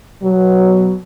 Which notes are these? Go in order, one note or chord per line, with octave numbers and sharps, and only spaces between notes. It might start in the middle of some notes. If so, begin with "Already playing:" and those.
B2 F#3